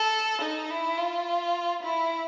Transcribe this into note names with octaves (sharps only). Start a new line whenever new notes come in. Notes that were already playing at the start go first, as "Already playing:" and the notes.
Already playing: A4
D#4
E4
F4
E4